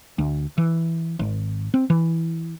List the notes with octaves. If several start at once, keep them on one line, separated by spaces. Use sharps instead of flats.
D2
E3
G#1
C4
E3